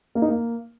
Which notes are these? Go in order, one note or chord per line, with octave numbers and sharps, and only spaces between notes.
A#3
D#4
A#3